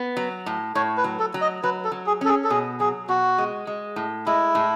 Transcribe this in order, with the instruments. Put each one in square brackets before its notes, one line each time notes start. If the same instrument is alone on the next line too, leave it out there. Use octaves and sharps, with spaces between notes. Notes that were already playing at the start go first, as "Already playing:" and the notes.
Already playing: [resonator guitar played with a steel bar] B3
F#3
A2
[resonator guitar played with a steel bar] A2 [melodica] C#5
[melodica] B4
[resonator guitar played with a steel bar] F#3
[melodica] A4
[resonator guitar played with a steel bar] F#3
[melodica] D#5
[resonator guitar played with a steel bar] F#3 [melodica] B4
[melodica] A4
[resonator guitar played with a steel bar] F#3
[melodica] G#4
[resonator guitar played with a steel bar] C#4 [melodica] A4
[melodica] G#4
A4
[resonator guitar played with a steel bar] B2 [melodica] G#4
[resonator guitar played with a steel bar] F#3 [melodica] G#4
[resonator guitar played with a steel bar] B2 [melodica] F#4
[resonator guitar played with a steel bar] G#3
G#3
A2
[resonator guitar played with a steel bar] G#3 [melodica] E4
[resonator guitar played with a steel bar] A2